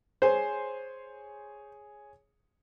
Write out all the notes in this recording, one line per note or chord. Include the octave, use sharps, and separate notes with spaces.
G#4 C5 C#5 G#5